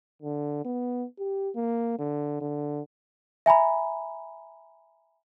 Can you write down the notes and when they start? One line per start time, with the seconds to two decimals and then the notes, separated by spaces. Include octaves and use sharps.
0.22 D3
0.65 B3
1.19 G4
1.55 A#3
1.99 D3
2.41 D3
3.46 E5 G#5 A#5 B5